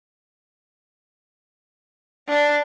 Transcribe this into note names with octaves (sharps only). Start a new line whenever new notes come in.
D4